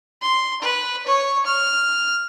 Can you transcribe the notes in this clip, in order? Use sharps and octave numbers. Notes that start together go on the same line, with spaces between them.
C6
B4
C#5
F6